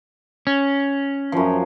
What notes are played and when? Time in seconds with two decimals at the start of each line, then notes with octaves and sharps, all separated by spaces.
0.47 C#4
1.32 F#2 F3